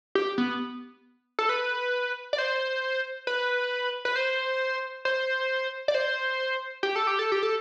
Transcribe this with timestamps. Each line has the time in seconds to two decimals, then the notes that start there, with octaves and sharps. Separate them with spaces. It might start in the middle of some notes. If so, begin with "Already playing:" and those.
0.15 G4
0.38 B3
1.39 A4
1.49 B4
2.33 D5
2.38 C5
3.27 B4
4.05 B4
4.16 C5
5.05 C5
5.88 D5
5.95 C5
6.83 G4
6.96 A4
7.07 G4
7.19 A4
7.32 G4
7.43 A4